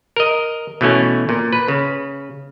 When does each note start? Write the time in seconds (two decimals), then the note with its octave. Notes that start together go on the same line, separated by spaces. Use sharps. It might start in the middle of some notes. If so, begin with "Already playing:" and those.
0.16 A#4 D#5
0.81 B2 E3 A3 C#4
1.29 A#2
1.53 B4
1.68 C#3